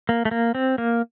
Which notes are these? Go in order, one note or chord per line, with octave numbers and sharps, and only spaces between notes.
A#3
A3
A#3
C4
A#3